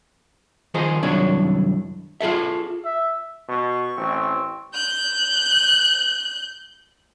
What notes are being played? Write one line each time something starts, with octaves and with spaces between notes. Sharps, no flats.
D#3 F3 D#4 G#4 C5
C2 F#2 D#3 D4 E4 C#5
F4 G#4 A4 E5
E5
B2 C#6
A1 C4
F#6 G6